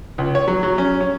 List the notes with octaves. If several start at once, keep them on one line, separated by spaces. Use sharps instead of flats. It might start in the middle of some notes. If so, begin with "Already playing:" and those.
C#2
C#5
F#3
F#3
C#4
C#4